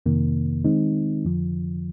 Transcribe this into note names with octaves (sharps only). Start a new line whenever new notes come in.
F2 C3 D#3 A#3
D#3 G#3 C4 D#4
F2 D3 F3